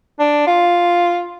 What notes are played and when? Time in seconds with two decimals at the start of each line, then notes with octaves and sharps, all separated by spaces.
0.19 D4
0.47 F4